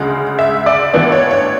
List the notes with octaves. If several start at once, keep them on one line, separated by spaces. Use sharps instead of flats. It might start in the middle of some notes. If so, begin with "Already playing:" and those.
Already playing: D2 C#3 G#3
E5
D5
A1 A2 E3 B3 D4 D5
C#5
C#5